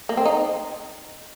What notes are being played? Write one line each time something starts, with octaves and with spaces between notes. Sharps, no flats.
A#3
C4
D#4